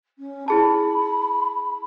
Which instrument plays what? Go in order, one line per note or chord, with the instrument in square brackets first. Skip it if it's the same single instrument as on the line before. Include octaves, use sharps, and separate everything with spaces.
[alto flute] C#4
[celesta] E4 G#4 A5 [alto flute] B5